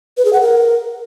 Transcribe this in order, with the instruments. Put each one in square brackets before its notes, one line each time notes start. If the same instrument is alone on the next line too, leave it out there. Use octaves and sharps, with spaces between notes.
[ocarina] B4
G#4
F#5
A#4